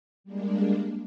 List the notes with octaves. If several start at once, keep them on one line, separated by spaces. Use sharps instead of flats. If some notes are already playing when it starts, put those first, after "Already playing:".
G3 G#3 A#3 D4